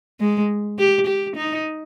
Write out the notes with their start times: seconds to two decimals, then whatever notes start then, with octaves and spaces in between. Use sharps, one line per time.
0.20 G#3
0.78 G4
1.07 G4
1.36 D#4